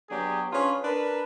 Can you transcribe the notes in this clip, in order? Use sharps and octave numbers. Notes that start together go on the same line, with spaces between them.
F#3 B3 D4 G4 G#4
C#4 D4 F4 G#4 B4
D4 A#4 B4